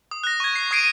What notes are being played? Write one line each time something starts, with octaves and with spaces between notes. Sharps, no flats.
D#6
F#6 A#6
C#6 G#6
C7
C#6 D#6 G#6 C7 D7 D#7